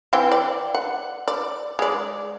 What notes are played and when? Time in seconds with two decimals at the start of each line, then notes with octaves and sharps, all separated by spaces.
0.13 E3 C4 G5
0.32 D5
0.74 F#5
1.28 D5
1.79 G#3 D5